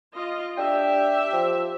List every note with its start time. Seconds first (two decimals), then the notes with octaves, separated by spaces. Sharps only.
0.12 F4 D#5
0.58 D4 G4 E5 G5
1.33 F3